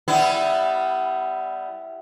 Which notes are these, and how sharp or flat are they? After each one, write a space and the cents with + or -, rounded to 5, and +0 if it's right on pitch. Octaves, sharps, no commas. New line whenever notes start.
G3 +0 B3 +25 E4 +0